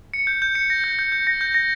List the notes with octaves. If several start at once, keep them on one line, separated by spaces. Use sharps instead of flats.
C#7
G6
G6
C#7
A#6
G6
G6
G6
A#6
G6
A#6